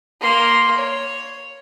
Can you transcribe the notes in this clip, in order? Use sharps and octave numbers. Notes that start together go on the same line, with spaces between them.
A#3 C6
C#5